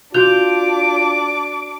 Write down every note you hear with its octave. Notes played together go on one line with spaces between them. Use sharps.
D4 F4 F#4 D6 G6 F7